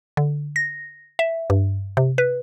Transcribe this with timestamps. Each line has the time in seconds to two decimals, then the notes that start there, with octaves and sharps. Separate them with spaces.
0.17 D3
0.56 A#6
1.19 E5
1.50 G2
1.97 C3
2.18 B4